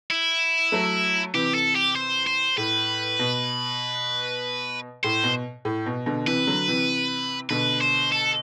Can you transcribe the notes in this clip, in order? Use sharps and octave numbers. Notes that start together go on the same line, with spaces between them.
E4
F#3 A3
C3 E3 G4
A4
G4
C5
C5
A2 B4
B2
A2 C5
B2
A2
B2
B2 D3
C3 E3 B4
D3 F#3
C3 E3
B2 D3 B4
C5
A4